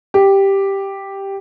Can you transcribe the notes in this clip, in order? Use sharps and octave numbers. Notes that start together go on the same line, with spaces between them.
G4